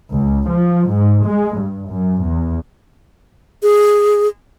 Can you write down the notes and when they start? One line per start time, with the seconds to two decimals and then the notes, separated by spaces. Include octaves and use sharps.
0.13 C#2
0.49 F3
0.91 G#2
1.26 G#3
1.59 G2
1.90 F#2
2.26 E2
3.63 G#4